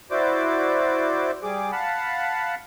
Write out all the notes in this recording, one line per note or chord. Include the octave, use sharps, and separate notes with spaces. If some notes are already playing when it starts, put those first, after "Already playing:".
E4 F#4 C5 D5 D6
G3 G#4 D6
F5 F#5 A5 B5